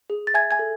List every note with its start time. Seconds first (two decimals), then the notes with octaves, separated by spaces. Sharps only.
0.10 G#4
0.27 A6
0.34 E5 G#5 G#6
0.51 G#5 G#6
0.59 A4